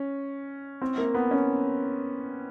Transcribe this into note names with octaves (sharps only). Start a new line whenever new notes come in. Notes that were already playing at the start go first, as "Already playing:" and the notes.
Already playing: C#4
C4
A#3
B3
C#4